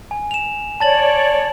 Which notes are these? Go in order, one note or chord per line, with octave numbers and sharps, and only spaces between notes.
G#5
E7 F7
C#5 D5 A5 A6 F#7